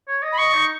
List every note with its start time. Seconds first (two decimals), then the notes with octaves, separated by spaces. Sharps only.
0.08 C#5
0.22 D#5
0.32 B5
0.38 D#5 C#6
0.54 D#4